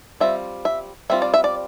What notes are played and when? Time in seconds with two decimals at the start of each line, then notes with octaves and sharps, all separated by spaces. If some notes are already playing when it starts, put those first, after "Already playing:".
0.20 G3 C4 F4 E5
0.65 E5
1.10 G3 C4 F4 E5
1.22 D5
1.34 E5
1.44 D5